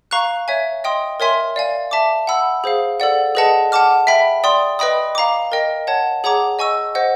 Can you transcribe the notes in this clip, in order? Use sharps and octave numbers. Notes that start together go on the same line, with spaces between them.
F5 A#5 C#6 F#6
C#5 E5 G#5
D#5 G5 C6 D#6
A#4 C#5 E5 G#5 C6
D5 F5 G#5
E5 A5 D6
F#5 B5 E6
G#4 C5 F5
A4 D5 F#5
G#4 B4 D#5 F#5 A5
F#5 A5 D6 F6
E5 G5 B5
D5 G5 C6 D#6
B4 D#5 G5 B5 D#6
F5 A#5 D6
A#4 D#5 G5
C#5 F#5 A5
G#4 C#5 F#5 A#5 D6
D#5 G#5 C#6 E6
C5 D#5 F#5